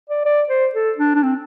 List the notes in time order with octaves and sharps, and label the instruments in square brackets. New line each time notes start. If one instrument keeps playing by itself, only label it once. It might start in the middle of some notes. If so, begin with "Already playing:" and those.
[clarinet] D5
D5
C5
A4
D4
D4
C4